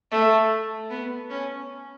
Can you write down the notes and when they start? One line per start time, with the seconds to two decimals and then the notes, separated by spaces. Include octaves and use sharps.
0.12 A3
0.90 B3
1.30 C#4